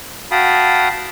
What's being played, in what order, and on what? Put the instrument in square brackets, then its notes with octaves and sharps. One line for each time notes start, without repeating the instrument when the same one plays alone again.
[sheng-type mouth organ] F#4 F5 G5 A5 B5 D#6